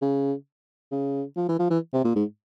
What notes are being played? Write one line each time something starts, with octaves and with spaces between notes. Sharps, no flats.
C#3
C#3
F3
E3
F3
E3
C3
A#2
G#2